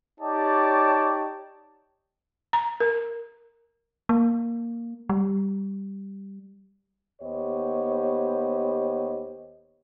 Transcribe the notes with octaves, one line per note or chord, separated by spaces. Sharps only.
D#4 G4 C#5 D5 G5 A5
A#5
A#4
A#3
G3
D#2 B3 G4 C5 C#5 D#5